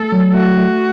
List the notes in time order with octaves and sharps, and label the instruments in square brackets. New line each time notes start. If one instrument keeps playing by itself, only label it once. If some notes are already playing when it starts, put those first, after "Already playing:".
Already playing: [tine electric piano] A3 [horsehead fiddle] A4
[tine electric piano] F#3
[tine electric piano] A3 [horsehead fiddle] F#4
[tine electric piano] A3